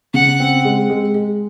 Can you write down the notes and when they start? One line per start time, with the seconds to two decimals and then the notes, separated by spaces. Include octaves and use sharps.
0.14 C#3 F#5
0.40 C4
0.65 G#3
0.90 G#3
1.14 G#3